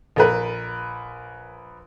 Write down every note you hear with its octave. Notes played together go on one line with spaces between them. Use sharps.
A#1 A#4 B4